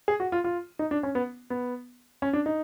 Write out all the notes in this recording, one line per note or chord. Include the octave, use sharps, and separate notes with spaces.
G#4
F#4
F4
F4
D#4
D4
C#4
B3
B3
C#4
D4
D#4